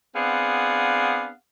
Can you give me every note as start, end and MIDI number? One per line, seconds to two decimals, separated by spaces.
0.15 1.31 59
0.15 1.31 60
0.15 1.31 62
0.15 1.31 68
0.15 1.31 77
0.15 1.31 78